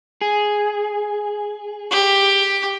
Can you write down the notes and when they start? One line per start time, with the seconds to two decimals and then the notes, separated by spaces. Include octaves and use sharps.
0.21 G#4
1.91 G4